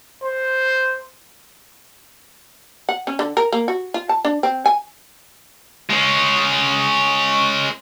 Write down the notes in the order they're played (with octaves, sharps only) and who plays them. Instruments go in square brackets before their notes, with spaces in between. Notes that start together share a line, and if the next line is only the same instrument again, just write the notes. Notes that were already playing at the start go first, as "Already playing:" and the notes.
[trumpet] C5
[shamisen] F#5
C#4
D3
A#4
A#3
F#4
F4
A5
D4
C4
G#5
[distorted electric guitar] G#3 C#4